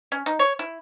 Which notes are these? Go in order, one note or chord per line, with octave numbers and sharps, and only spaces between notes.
C#4
D#4
C#5
E4